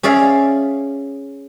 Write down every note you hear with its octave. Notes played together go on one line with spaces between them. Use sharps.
C#4 G#4 D5 E5 F5